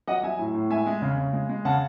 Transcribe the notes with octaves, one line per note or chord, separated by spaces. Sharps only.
F#3 D#5 F#5
F#3 E5 G#5
A2
A2
G#3 E5 G#5
G#3
C#3
C#3
G#3
G#3
C#3 F#5 A5